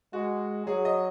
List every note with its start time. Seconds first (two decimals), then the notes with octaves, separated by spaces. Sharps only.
0.13 G#3 F#4
0.67 F#3 G#4
0.85 D#5